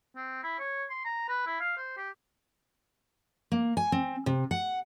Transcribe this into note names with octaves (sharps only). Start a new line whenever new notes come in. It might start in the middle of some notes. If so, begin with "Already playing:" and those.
C4
E4
C#5
C6
A#5
B4
E4
F5
C5
G4
A#3
G#5
C4
C3
F#5